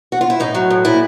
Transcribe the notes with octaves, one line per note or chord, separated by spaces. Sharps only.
F#4
F4
E4
A2 D#4
F#3
A2
A#2 E4